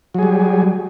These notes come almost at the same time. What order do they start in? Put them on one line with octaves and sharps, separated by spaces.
F#3 G#4 G3